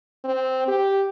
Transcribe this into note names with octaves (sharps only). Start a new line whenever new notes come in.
C4
G4